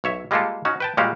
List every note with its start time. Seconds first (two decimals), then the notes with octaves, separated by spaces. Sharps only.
0.04 B1 C#5 E5
0.31 G3 G#3 A#3 F4 G4 A4
0.65 C#4 D#4 F#4
0.80 B4 G5 A5
0.97 A#2 G3 G#3 F#4 G4 F5